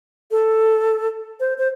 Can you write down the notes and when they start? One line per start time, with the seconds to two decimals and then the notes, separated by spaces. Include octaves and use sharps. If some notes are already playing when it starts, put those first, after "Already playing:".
0.31 A4
1.40 C5
1.58 C5